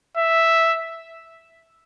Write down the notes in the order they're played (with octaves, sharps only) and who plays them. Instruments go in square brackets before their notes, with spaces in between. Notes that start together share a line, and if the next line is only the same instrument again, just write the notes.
[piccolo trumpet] E5